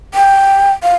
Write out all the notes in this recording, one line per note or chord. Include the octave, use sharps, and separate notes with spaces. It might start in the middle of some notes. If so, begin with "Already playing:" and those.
G5
F5